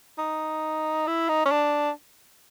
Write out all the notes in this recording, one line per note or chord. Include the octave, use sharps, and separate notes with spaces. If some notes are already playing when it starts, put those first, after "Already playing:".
D#4
E4
D#4
C#4
D4